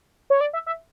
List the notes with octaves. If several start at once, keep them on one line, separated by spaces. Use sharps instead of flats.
C#5
D5
E5
E5